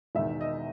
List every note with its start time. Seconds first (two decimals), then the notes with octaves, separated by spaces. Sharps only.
0.15 E1 E2 D#3 E5
0.41 D#5